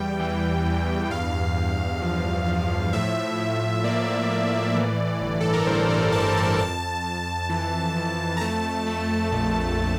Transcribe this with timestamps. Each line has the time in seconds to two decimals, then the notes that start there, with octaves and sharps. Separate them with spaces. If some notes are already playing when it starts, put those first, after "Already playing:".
Already playing: E2 G3 G5
0.20 E3
0.66 E2
1.10 G2 F5
1.57 G2
2.01 F3
2.48 F3
2.93 A2 E5
3.39 A2
3.84 A#3 D5
4.30 A2
4.75 E3
5.21 G1
5.41 A4
5.53 A#4
5.67 G2 C5
5.90 D5
6.12 E3 A5
6.35 A5
6.59 F2 A5
7.04 F2
7.50 E3
7.96 F2
8.37 A#5
8.40 A3 A5
8.87 A3
9.32 A#1
9.78 A3